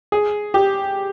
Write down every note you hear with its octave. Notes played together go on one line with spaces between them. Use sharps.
G#4
G4